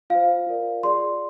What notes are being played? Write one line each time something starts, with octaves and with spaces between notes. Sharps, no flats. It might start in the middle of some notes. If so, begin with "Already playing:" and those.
F4 C5 F5
F4 A#4 D5
F4 G#4 D5 C6